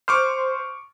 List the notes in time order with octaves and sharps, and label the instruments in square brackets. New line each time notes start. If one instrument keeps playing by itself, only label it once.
[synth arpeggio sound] C5 [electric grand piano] C#6 D6 F6